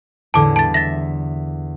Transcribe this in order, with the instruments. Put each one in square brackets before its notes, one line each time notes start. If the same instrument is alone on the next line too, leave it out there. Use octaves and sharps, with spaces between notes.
[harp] E2 A2 D3 [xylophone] A5 D6
[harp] G3 [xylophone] A5 A6
[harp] E5 [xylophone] A6 A#6